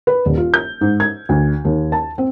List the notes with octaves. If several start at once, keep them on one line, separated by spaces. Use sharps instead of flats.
B4
D#1
F4
G6
G#2
G#6
D2
D#2
A5
C4